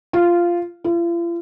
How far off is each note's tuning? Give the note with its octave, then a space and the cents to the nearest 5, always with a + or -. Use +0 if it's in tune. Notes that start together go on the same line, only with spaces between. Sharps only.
F4 -10
F4 -45